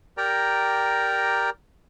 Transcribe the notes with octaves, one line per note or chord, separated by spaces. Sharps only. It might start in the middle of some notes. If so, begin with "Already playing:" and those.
G4 A#4 D5 G5 A#5